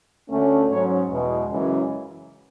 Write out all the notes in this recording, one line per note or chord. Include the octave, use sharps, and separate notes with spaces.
D2 D3 A3 C#4
G#2 F#3 C#4 C#5
E2 B2 G#3
F#2 C#3 E3 G#3